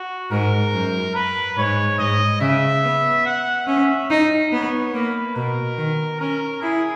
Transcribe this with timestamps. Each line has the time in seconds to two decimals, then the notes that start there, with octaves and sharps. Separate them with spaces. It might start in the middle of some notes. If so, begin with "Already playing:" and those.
Already playing: F#4
0.31 G#2 A#4
0.73 F#2
1.15 B4
1.57 G#2 C#5
1.99 G#2 D#5
2.41 C#3 E5
2.83 B3
3.26 F#5
3.67 C#4 E5
4.10 D#4
4.52 B3 C#5
4.94 A#3 B4
5.36 B2 A#4
5.78 D#3
6.20 C#4 A#4
6.62 E4 G#4